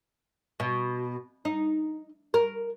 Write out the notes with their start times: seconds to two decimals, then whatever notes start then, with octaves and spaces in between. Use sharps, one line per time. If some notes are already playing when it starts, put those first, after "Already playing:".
0.60 B2
1.45 D#4
2.34 A#4